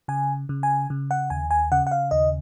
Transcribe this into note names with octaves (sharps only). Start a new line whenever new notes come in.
C#3 G#5
C#3
G#5
C#3
F#5
D#2 G#5
G#5
C#3 F#5
F#5
F5
D#2 D#5